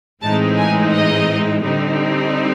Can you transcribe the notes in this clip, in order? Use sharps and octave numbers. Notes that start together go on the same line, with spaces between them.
A2 E3 G#3 C4 D#4 A5
G#5
D#5
D3 G3 C4 D#4